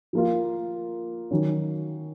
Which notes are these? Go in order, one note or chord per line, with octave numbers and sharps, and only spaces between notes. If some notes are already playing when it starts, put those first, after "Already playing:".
F3 A#3 F4
D#3 F#3 C#4